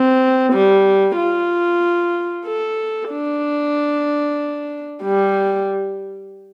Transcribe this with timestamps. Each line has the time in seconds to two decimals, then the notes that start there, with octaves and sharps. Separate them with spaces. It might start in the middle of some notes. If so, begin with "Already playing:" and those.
Already playing: C4
0.53 G3
1.17 F4
2.46 A4
3.11 D4
5.03 G3